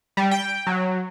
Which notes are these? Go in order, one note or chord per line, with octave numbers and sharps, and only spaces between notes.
G3
G5
F#3